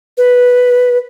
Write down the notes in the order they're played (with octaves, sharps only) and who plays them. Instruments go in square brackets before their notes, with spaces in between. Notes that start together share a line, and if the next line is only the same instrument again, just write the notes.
[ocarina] B4